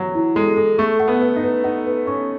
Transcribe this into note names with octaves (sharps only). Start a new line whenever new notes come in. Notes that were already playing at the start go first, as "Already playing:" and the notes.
Already playing: E3 F#3
E4
G#3 A4
A4
A3 C#6
F#5
B3
B4
D#4
B4
D#4 F#5
B4
C#4 C#6